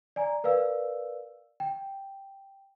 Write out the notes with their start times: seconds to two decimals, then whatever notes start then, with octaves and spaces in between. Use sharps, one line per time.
0.16 D5 G#5 A#5
0.44 A#4 B4 D5 F5 E6
1.60 G5